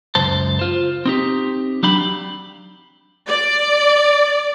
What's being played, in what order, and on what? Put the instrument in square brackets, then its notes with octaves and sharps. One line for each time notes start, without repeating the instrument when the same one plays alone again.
[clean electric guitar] C#2 F#2 C5 A5
F4 C5
C4 D#4 G4
F#3 D4 F5 G5 B5
[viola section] D5